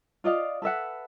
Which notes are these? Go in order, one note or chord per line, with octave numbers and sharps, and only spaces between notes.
F4 D5 D#5 F5
A4 B4 E5 F#5